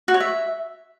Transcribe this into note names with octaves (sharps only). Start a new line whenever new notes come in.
F#4
C#5
E5